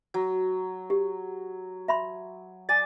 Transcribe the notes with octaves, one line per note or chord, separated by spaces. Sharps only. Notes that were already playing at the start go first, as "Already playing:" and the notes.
F#3
G4
E5 B5 C6
D5 G#5 A6